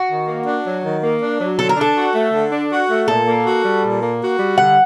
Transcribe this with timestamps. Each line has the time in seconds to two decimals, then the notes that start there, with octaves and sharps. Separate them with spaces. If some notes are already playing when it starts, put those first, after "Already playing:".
Already playing: F#4
0.10 D#3
0.27 A#3
0.47 D4
0.65 F#3
0.84 D#3
1.03 A#3
1.22 D4
1.40 F#3
1.58 D3 A4
1.69 A#4
1.77 D4 A4
1.96 F#4
2.15 A3
2.33 D3
2.52 D4
2.71 F#4
2.90 A3
3.08 A#2 A4
3.26 A#3
3.45 F#4
3.64 G3
3.83 A#2
4.01 A#3
4.20 F#4
4.39 G3
4.58 D3 F#5